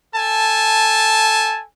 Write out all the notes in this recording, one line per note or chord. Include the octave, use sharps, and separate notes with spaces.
A4 G#5 A5